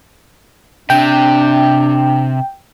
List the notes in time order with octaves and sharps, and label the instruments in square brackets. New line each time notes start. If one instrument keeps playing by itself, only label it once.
[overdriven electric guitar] C3 [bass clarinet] D4 [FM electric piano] G5